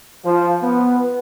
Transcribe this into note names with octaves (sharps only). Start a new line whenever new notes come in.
F3
B3